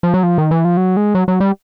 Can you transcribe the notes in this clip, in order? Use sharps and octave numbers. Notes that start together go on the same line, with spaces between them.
F3
F#3
F3
D#3
E3
F3
F#3
G#3
F#3
F#3
G3